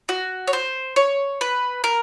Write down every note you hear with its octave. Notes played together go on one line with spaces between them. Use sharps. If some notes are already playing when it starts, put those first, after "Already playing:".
F#4
C#5
C5
C#5
B4
A#4